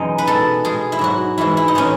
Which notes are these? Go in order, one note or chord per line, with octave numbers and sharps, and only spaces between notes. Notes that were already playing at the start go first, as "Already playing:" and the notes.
Already playing: F#2 B2 E3 G#3 D#4
B4
B2 G#3 A4
B2 G#3 G#4
E4
G#2 F#3 F#4
G#2 E3 G#3 E4
E4
D#4
A2 E3 G#3 C#4